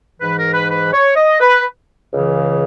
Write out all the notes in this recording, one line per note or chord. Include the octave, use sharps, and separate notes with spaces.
G#2 E3 B4
A#4
B4
B4
C#5
D#5
B4
C#2 C#3 E3